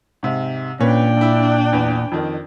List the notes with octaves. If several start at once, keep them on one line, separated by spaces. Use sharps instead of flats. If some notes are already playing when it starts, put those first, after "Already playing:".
G#2 C3
A#2 C#4 D4 B4 G5
A#1 E4
E2
F2 D#3